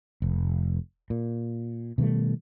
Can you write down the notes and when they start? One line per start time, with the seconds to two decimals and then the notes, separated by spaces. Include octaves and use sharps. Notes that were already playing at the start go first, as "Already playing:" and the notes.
0.22 F1
1.10 A#2
1.98 B2 D#3 G3 A3